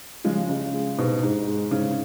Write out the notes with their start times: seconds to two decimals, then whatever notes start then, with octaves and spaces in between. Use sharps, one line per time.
0.24 C#3 F3 G#3
0.49 C#3
0.74 G#3
0.98 G#2 B2
1.23 G#2
1.47 G#3
1.71 G#2 C#3